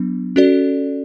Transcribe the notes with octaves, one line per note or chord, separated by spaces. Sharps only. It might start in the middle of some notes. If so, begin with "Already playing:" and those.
Already playing: F#3 B3 D4
C#4 F#4 A4 D5